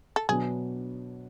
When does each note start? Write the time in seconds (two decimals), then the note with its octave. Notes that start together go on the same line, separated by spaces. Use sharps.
0.16 A4
0.29 B2 F#3 B3 D4 G#4